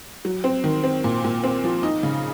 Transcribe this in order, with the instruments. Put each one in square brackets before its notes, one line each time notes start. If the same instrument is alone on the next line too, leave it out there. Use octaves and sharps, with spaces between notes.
[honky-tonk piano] F#3
C4
D#3
C4
A#2
A#2
C4
F3
D#4
C#3